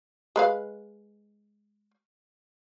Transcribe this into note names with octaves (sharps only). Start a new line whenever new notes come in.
G#3 B4 F5